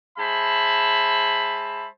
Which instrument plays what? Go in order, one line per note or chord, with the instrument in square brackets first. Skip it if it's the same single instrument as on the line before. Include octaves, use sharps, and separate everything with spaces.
[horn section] G#3 C5 E5 A5 B5